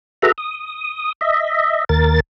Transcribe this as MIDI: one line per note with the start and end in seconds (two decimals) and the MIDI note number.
0.22 0.32 66
0.22 0.32 68
0.22 0.32 69
0.22 0.32 71
0.22 0.32 76
0.22 0.32 82
0.38 1.12 87
1.21 1.84 75
1.21 1.84 76
1.89 2.20 39
1.89 2.20 70
1.89 2.20 93